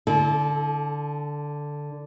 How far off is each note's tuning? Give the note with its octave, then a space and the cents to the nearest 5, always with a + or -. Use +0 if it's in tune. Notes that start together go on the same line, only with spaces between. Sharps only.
D3 +0 A4 -35